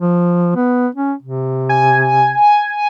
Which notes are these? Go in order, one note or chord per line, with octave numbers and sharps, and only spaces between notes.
F3
B3
C#4
C3
G#5